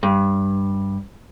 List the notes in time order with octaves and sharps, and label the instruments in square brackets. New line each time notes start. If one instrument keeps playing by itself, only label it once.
[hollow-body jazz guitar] G2